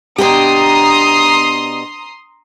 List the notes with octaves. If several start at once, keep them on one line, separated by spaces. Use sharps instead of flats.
B2 D4 G4 A#5 C6 D#6